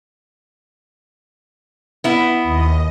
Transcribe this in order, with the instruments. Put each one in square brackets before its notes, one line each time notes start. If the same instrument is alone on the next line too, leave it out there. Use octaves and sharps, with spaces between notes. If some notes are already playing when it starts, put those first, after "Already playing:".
[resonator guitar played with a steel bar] B3 E4
[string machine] D#2 D#5